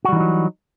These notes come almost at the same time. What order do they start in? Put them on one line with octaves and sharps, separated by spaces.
F#4 G3 E3 D#4 F#3